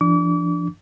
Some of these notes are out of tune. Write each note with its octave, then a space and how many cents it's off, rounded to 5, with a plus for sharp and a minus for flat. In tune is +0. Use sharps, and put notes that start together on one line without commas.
F3 -45 D4 +0 D6 -40